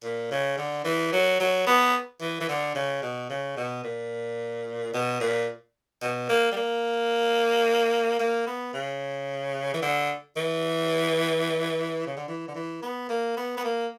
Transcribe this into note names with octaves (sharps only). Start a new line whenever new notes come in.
A#2
C#3
D3
E3
F#3
F#3
B3
E3
E3
D3
C#3
B2
C#3
B2
A#2
B2
A#2
B2
A#3
G3
A#3
A#3
B3
C#3
E3
D3
E3
C#3
D3
E3
D3
E3
B3
A#3
B3
B3
A#3